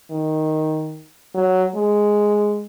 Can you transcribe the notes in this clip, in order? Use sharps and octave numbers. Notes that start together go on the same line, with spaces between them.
D#3
F#3
G#3